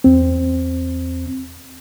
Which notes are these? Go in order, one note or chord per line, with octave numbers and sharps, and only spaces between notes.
E2 C4